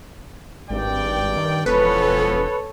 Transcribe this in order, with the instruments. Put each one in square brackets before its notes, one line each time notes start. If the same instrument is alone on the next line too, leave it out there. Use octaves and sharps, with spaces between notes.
[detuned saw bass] G#1 [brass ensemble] G2 D5 G5
[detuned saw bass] D#3
[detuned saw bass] E1 [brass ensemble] F3 B3 C#4 [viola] A4 C#5 [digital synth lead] B4